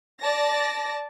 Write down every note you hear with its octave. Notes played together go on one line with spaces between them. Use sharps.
D5 A5 A#6